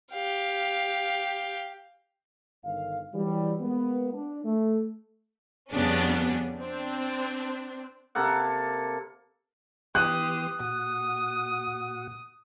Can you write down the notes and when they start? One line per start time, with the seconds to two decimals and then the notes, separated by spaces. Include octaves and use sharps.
0.13 G4 F5
2.64 G1 D#3 F5
3.15 E3 F#3 G3
3.61 G#3 A#3 B3
4.13 D4
4.45 A3
5.70 F2 C#3 G3 B3 C#4 D4
6.59 C4 D4
8.15 C3 A#3 A4 F#5
9.95 E3 B3 G4 C6 D#6 F#6
10.60 A#2 F#4 F#5 D#6